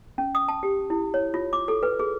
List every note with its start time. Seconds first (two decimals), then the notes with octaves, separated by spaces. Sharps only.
0.18 C#4
0.35 D#6
0.48 A5
0.63 G4
0.90 E4
1.14 C#5
1.34 F4
1.53 D6
1.68 A4
1.83 B4
1.99 G#4